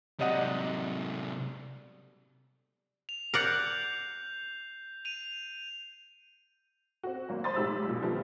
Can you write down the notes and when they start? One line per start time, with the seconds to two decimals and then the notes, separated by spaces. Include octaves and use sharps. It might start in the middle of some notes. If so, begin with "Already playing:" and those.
0.20 C3 F#3 G3 D#5 F#5
3.09 F7
3.34 A#4 D5 F#5 G6 C7
5.05 D#7 F7
7.03 C4 F#4
7.29 G#1 F#3 A#3
7.44 C5 B5 C6 D#6 A6
7.56 F1 B1 G#2 G4 B5 E6
7.85 A#1 B2
8.02 A#2 D3 F3 G3 A3 B3